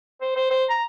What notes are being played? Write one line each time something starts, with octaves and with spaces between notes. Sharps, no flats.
C5
C5
C5
A#5